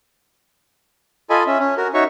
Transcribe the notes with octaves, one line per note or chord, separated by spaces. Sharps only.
F4 A4 D#5 G#5 B5
C#4 E5
C#4
F#4 A#4
D#4 F#4 C#5 E5 C#6